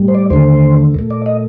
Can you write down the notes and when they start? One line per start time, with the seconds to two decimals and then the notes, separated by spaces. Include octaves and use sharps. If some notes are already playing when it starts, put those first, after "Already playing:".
Already playing: A2 G3
0.08 C5
0.15 D5
0.30 D#2 D3 A3 C5
0.94 A#2 A3
1.10 D5
1.26 D#5